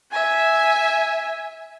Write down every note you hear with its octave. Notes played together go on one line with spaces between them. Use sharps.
E5 G#5